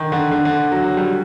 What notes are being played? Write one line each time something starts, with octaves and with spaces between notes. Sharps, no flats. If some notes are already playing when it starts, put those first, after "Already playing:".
Already playing: D3 D#3
D3
D3
D3
F#3
F#3
G3